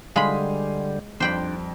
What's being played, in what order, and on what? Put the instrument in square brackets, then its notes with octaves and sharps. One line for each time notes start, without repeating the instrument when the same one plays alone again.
[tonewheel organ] D3 G3 [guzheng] G#3 B5 [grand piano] F5 G#5 C6
[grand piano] F2 G3 [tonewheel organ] D4 [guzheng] C5 G5 B5